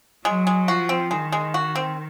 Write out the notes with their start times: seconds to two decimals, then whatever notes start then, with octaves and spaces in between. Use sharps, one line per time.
0.25 F#3 G#3
0.47 G#3
0.67 F3 F#4
0.89 C4
1.11 D#3 G#3
1.32 G#3
1.54 F#4
1.75 C4